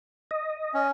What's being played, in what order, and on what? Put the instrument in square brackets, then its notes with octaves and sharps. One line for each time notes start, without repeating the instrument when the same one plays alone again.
[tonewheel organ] D#5
[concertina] C#4